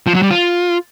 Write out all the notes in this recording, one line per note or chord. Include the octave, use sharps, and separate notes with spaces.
F3
F#3
G3
F4